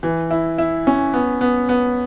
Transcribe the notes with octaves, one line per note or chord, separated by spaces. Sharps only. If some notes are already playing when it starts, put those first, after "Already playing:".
E3
E4
E4
C#4
B3
B3
B3